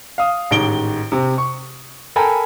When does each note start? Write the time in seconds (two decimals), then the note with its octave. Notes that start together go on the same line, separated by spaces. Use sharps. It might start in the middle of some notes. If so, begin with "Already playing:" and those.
0.18 F5 D#6
0.51 A1 G#2 D#3 D7 G7
1.12 C3 C4
1.38 C#6
2.16 A4 A#4 G5 G#5 A#5 B5